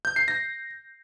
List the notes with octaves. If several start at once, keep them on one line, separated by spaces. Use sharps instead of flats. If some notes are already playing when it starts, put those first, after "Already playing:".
G6
C7
A#6